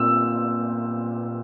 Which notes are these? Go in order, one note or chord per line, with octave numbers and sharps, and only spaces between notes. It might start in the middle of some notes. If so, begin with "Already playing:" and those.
Already playing: A#2 C4 E6